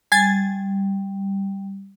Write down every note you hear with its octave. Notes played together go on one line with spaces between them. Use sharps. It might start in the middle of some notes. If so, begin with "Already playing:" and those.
G3 G#5 G#6 A6